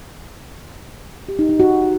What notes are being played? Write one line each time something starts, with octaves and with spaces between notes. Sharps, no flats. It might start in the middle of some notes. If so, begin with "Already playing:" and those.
G4
D#4
D#4
F#4